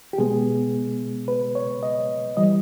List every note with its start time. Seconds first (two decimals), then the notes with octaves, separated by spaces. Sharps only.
0.13 G4
0.18 B2 G#3 B3 G#4
1.28 B4
1.55 C#5
1.83 D#5
2.37 E3 G3 D#5